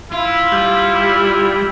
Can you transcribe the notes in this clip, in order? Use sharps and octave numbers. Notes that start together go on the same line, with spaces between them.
E4 F4
G3